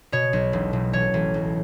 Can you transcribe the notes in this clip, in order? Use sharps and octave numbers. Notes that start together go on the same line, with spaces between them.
B2 C#5
B1
E1
E1
A1 C#5
A1
B1